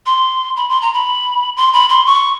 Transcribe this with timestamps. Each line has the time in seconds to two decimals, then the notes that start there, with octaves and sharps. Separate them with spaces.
0.06 C6
0.57 B5
0.70 C6
0.82 A#5
0.94 B5
1.57 C6
1.73 B5
1.89 C6
2.06 C#6